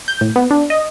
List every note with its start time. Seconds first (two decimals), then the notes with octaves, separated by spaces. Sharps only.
0.08 G6
0.21 A2
0.36 B3
0.51 D4
0.70 D#5